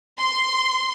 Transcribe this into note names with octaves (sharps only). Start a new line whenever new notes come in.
C6